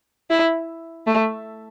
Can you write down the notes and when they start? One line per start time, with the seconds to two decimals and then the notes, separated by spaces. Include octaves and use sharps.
0.30 E4
1.06 A3